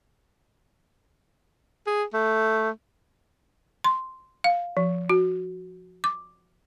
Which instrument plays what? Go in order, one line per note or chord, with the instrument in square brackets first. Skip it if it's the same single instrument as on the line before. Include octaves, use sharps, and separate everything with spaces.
[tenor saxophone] G#4
A3
[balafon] C6
F5
F3
F#4
D6